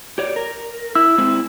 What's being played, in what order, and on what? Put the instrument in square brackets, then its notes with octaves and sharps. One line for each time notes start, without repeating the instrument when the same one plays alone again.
[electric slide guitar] G4 C#5 D5
A#4
[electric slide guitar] E4 [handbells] E6
[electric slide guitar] G#3 C4 E4